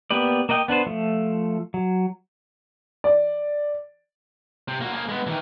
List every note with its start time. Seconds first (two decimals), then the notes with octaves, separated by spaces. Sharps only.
0.11 A#3 B3 G4 B4 D5
0.49 A#3 A#4 D#5 F#5 G5
0.68 B3 D4 B4 C5
0.86 F3 A3
1.74 F#3
3.04 D5
4.68 C3
4.81 A#3 F#4
4.93 A#3 G#4
5.09 G#3 B3
5.27 D#3 E3